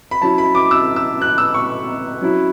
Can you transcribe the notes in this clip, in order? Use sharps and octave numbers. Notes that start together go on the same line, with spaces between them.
B5
F#3 C#4 E4 A5
B5
D6
E6
E6
F#6
E6
C#6
F#3 C#4 E4